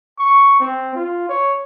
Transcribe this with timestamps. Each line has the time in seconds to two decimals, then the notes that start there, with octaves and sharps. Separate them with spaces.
0.19 C#6
0.60 C4
0.95 F4
1.29 C#5